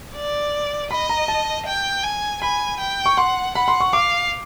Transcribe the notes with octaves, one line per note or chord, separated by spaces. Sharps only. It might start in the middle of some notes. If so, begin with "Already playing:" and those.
D5
D#5 B5
A#5
A5
G5
G#5
G#5 B5
G5
C#6
F#5 C6
F#5 B5
C6
C#6
F5 D6